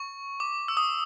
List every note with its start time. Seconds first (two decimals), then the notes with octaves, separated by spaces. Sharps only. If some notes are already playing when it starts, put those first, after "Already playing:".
Already playing: C#6
0.40 D6
0.68 E6
0.77 D#6